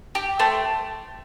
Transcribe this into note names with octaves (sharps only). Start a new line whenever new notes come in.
G4
A3 C5